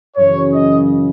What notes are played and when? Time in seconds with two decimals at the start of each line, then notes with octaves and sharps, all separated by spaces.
0.17 F#2 C#3 E3 C#5
0.53 D#5